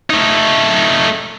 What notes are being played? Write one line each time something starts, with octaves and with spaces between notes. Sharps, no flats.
A3 D#4